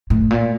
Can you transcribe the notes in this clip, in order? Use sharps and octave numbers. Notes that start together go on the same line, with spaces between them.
A2
A#2